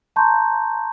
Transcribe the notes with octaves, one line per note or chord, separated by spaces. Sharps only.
A5 A#5 C6 C#6 G6